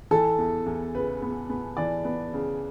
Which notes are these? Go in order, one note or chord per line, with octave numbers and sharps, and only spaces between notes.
E3 A4
E2
E2
C#3 B4
B3
B3
E3 D5
B3
C#3